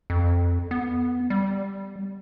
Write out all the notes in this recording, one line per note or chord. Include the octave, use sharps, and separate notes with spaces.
F2
B3
G3